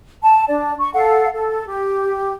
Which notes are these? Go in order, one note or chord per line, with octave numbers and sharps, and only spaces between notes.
A5
D4 D5
C#6
A4 F5 F#5
A4
G4